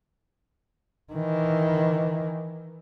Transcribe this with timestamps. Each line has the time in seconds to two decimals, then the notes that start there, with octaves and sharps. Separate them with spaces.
1.13 D#3 E3